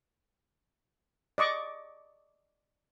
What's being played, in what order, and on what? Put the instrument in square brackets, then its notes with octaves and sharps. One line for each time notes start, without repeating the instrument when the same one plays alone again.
[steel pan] D5 D#5 C#6 D6